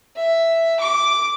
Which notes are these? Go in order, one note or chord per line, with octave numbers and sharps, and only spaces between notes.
E5
D6